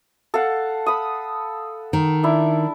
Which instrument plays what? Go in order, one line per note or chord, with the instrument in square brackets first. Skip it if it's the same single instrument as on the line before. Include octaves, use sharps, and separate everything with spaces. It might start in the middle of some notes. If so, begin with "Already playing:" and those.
[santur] A4 F5 F#5
B5 D#6
[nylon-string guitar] D#3
[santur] D4 E4